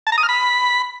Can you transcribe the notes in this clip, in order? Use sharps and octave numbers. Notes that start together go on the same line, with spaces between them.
A5
A#5
D#6
F6
B5